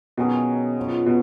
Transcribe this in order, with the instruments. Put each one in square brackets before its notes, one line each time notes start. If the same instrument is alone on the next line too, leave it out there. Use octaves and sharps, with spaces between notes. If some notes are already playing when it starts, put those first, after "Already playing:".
[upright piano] B2 [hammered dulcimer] D#3 F#3 C#4 G#4
[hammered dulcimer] F#2 F3 B3
[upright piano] B2